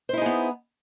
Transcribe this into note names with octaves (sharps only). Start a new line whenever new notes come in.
B3 D#4 E4 G#4 C5